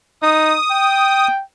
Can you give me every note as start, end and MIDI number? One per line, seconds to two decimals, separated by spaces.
0.22 0.57 63
0.22 1.28 87
0.70 1.42 79